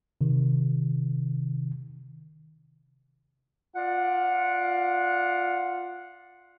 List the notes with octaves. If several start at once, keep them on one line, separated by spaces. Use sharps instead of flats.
C3 D#3
F4 D5 F5 F#5